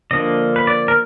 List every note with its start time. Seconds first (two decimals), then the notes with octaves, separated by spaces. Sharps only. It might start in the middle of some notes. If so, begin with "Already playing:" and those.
0.11 D3 F3 A#3 D4 D#5
0.56 B4
0.67 D5
0.88 A#4